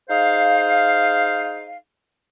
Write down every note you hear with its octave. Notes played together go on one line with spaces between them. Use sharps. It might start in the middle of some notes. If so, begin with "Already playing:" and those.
D#4 G#4 C5 F5